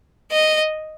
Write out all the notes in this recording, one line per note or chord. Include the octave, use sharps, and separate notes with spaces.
D#5